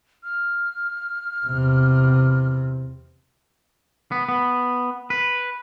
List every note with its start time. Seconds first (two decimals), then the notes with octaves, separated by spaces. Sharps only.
0.24 F6
1.46 E2 C3
4.12 B3
4.29 B3
5.10 B4